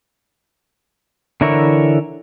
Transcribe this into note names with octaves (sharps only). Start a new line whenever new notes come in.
D3 E3 E4 A#4 C#5